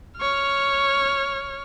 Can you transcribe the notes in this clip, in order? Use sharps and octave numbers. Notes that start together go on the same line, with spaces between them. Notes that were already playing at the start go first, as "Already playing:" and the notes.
C#5 F6